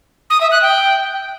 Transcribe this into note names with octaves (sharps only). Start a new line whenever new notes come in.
D#6
E5
F#6
G5